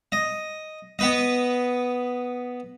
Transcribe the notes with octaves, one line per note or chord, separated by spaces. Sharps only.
D#5
B3 B4 D#5